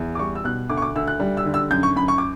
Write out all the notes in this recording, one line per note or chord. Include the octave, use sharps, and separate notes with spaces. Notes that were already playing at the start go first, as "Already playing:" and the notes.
Already playing: E2
D6
G3 C#6
E6
B2 F#6
D2 D6
C#6
D6
D2 E6
F#6
G3
E6
D3
E6
F#2 G6
C#6
F#2 B5
C#6
D6